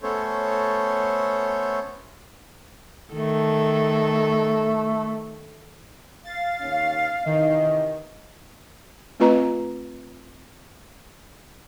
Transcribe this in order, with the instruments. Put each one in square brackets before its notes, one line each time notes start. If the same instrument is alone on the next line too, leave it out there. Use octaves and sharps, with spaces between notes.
[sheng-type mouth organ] A3 B3 C#4 A4 C5 C#5
[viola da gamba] D#3 A4 [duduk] A3
[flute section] F5 [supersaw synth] A6
[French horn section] D#2 C#4
[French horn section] C3 E3 D#5 [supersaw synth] D#3
[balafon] A3 C4 F4 B4 D#5 A#5